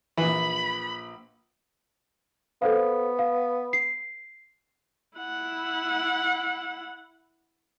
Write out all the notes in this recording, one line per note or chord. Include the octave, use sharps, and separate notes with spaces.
A#1 E3 B4 B5
B3 A4 C5 F5
F5
C7
E4 F#5